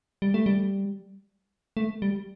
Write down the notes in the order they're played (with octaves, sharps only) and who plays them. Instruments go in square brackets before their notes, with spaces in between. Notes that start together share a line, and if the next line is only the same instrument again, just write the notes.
[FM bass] G3
A3
G3
A3
G3